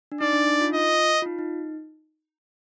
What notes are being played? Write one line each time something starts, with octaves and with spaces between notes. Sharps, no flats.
D4
D#4 D5
D4
D#4
F4
F4 D#5
F4
D#4
D#4